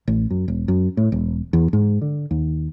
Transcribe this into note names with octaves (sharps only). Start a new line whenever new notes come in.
A1
F#2
E1
F#2
A2
E1
E2
G#2
D3
D#2